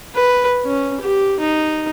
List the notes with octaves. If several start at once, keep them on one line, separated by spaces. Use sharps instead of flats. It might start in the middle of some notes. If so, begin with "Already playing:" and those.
B4
C#4
G4
D#4